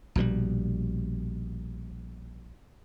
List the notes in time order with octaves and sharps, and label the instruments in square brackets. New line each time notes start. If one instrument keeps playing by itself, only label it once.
[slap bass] A#1 B2 D#3 G3